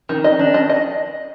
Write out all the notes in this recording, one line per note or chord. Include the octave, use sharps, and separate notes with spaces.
D#3
D#5
D4
D#5
D#5